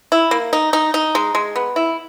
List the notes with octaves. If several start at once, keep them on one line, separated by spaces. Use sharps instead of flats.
E4
A#3
D#4
D#4
D#4
G#3
G#3
B3
E4